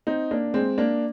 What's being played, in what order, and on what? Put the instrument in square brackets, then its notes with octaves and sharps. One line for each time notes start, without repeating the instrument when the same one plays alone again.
[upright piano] C4 D#4
A#3 D4
G#3 C4
A#3 D4